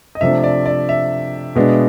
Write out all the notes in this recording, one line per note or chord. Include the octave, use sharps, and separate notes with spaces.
D#5
C3 F3 A3 D4 E5
D5
D5
E5
B2 G#3 B3 D4